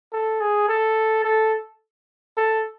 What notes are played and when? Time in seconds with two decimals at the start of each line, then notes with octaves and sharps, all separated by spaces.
0.13 A4
0.41 G#4
0.69 A4
1.24 A4
2.37 A4